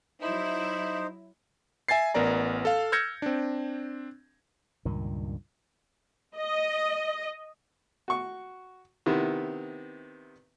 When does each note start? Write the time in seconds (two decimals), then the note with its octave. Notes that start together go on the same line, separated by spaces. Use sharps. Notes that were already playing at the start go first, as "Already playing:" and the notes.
0.22 F#3 D#4 E4 C5
1.89 E5 G#5 G#6 A6 C7
2.14 A1 B3 A#4 D5 A#5
2.65 A4 F5
2.92 E6 F6 G6 G#6 A#6 C#7
3.22 C4 D4
4.85 C#2 G2 A#2 D#3
6.37 D#5
8.08 F#4 C#6
9.06 C3 D#3 B3 E4